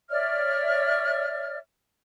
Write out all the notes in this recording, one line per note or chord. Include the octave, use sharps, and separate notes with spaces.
C#5 D5 E5 F6